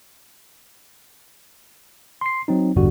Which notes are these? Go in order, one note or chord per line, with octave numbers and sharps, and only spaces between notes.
C6 C7
F#3 C4 D#4
A1 E2 G2 D3 G3 F#4